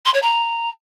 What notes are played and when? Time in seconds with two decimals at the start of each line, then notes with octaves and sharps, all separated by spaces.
0.05 C6
0.13 C#5
0.22 A#5